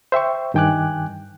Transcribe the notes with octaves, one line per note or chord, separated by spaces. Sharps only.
C5 E5 G5 C#6
G2 D#3 G5 G#5 D6 F#6